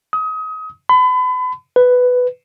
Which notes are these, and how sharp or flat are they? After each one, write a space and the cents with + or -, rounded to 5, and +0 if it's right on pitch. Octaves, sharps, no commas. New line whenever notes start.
D#6 +30
B5 +35
B4 +10